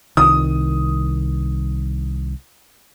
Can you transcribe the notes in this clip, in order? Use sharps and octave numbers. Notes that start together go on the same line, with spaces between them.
C2 D#3 D#6